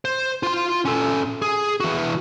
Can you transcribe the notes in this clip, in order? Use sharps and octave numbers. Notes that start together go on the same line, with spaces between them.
C5
F4 C6
C#4 A4
G#4
E3 F#4